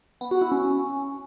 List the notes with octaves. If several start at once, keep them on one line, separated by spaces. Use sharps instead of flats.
B3
F#4
E4
C#4